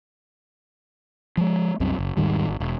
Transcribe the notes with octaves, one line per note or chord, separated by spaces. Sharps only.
F3 G#3
C2 F#2 C3
F#1
E1 G#2 D#3 G3
G#1
E1